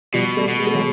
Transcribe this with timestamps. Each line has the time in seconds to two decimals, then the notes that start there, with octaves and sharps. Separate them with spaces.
0.13 B2 F3 G3
0.37 G3 A3
0.48 B2
0.59 G#3
0.67 A3
0.74 F#3 G#3